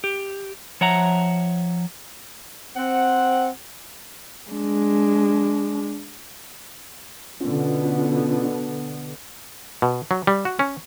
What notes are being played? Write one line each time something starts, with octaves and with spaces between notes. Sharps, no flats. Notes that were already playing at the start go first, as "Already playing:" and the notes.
G4
F3 C#5 E5 F#5 A#5
C4 F#5
G#3 D4
B2 D3 B3 C#4 F4
B2
F#3
G3
F#4
C#4